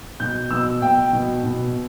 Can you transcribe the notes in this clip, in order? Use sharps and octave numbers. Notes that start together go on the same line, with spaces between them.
B2 G6
B2 E6
B2 G5
B2
B2